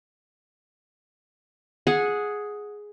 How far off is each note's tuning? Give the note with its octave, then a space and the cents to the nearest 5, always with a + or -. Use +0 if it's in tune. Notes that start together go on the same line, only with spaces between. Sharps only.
G#4 +5 F#5 -15